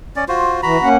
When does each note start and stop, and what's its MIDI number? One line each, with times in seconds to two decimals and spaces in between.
0.16 0.25 61
0.16 0.25 74
0.28 0.61 65
0.28 0.61 66
0.28 0.61 72
0.63 0.77 52
0.63 0.89 66
0.63 0.89 82
0.63 0.89 83
0.82 0.97 58
0.82 0.97 61
0.82 0.97 78